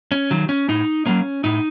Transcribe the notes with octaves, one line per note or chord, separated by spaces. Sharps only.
C#4
D#3 F#3
C#4
A2 D#4
F#3 A#3 C#4
A2 D#4